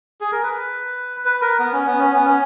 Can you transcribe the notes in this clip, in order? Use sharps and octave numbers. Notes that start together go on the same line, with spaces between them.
G#4
A#4
B4
B4
A#4
B3
C#4
B3
C#4
B3
C#4